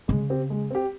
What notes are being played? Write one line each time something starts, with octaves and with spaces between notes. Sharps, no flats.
C#3 G#3
C4 G4
G#3
C4 G4